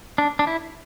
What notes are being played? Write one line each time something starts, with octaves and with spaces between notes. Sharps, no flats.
D4
D4
E4